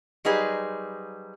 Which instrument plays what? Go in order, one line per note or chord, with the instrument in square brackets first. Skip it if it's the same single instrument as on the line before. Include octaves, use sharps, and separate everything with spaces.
[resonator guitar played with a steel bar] F#3 G3 D#4 G#4 B4 C5